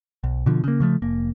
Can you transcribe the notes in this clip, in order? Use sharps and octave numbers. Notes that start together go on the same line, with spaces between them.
B1
B2 D3 F3
C#3 A#3
C#3 F3 A3
F1 A#3